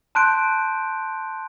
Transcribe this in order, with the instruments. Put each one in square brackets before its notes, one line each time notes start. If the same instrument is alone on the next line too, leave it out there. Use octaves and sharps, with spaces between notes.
[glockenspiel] A5 C6 F#6 G6 D7